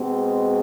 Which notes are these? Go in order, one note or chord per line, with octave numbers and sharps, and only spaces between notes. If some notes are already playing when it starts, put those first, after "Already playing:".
Already playing: B2 G#3 C4